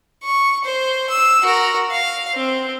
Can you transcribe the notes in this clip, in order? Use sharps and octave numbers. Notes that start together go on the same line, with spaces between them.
C#6
C5
E6
F#4 A#4
F5
C4